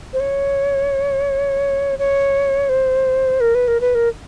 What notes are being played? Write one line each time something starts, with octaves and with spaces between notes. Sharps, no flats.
C5
C#5
C#5
C5
A#4
B4
A#4
B4
A#4